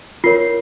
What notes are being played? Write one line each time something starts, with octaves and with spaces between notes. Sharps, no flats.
F4 A#4 C#5 C7